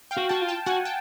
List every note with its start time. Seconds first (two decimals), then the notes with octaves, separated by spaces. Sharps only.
0.11 F5 G5
0.17 F#4
0.29 F#4 G5 A5
0.42 F4
0.48 G5 A5
0.66 F#4 F#5 G#5
0.85 G5 A5